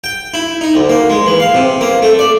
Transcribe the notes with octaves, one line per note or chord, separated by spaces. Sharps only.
G5
E4
D#4
D2
A#3
G#3
E3
F5
C3
A#3
A3
D5